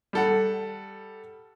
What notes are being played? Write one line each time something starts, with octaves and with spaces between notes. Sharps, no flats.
G3 A4 F#5